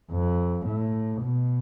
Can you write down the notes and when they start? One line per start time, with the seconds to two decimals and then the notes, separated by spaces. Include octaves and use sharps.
0.11 F2
0.67 A2
1.23 B2